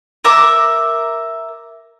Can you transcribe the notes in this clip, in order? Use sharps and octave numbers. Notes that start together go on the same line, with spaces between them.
A#4 E5 D6